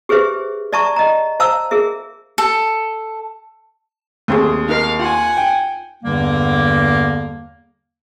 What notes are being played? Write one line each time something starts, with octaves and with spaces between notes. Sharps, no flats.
G4 G#4 B4 C5 E5
D5 E5 A5 A#5 C#6
D#5 A#5
C5 F5 A5 A#5 E6
G#4 A#4 E5
A4
D#2 A3 C4 G#4
D#4 A#4 F5
F4 F#5 G#5
G5
E2 G2 D3 G3 A#3